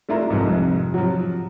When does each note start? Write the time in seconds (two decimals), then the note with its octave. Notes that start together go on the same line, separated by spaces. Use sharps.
0.09 A3 D4 E4 F4 A#4
0.30 C2 F2 G#2
0.94 F3 F#3